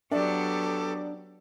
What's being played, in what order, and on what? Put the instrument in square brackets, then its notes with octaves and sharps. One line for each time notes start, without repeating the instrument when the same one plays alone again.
[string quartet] F#3 B3 G4 [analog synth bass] D4 [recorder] A4 [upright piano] D5